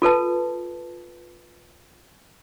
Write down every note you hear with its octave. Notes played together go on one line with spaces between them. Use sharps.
F4 A4 B4 A5